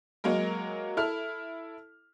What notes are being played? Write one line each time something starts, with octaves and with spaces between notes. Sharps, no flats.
F#3 G#3 A#3 A#4
E4 A4 F6